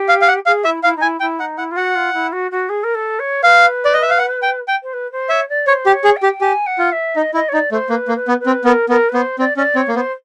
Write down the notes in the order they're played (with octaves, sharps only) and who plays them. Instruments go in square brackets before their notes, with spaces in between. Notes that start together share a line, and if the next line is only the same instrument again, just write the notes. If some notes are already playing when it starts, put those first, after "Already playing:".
Already playing: [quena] G4
[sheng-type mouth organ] F5
F5
F#5
[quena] G#4 [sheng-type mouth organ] F5
[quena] E4 [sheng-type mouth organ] E5
[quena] E4 [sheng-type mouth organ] F5
[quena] D#4
[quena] E4 [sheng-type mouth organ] G#5
[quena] E4 [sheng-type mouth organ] G5
[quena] D#4 [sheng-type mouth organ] F#5
[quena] E4 [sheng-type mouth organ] F#5
[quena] F4
[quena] F#4 [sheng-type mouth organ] F#5
[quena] F4
E4
F#4
F#4
G#4
A#4
A4
C#5
[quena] B4 [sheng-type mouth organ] F5
[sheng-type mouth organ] D5
D#5
E5
F5
F#5
G5
G5
[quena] C5
B4
C5
[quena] C#5 [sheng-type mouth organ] E5
[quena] D5
[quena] C5 [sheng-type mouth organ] C#5
[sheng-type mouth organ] G4
[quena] C#5
[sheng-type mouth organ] G#4
[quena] G5
[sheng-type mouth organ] G4
[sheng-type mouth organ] G4 [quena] G#5
[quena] F#5
[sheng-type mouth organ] F4
[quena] E5
[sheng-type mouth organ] D#4 [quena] D#5
[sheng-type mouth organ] E4 [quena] D#5
[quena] C#5
[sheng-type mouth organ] D#4 [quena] D5
[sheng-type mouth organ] A3 [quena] C5
[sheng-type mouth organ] A#3 [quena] B4
[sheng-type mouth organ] A#3
[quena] B4
[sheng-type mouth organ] B3
[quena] B4
[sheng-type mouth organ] C4
[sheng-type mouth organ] B3 [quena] A#4
[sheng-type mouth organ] B3 [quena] A#4
[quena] B4
[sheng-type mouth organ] B3 [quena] C5
[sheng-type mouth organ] C4 [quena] D5
[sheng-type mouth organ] C#4 [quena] D5
[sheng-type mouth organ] C4 [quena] C#5
[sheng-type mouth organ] A#3
[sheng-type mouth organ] B3 [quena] C5